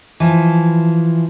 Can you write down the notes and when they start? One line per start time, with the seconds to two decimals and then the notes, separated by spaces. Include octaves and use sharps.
0.20 E3 F3